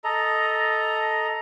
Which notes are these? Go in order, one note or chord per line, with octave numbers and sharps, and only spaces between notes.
A4 D#5 A#5